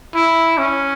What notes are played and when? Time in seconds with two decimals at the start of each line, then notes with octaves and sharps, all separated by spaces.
0.14 E4
0.58 C#4